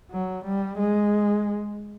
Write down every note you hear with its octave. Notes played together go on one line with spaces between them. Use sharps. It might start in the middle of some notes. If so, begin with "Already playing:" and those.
F#3
G3
G#3